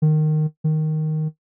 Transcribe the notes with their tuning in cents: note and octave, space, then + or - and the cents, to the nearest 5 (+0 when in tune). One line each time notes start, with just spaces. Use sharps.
D#3 -15
D#3 +0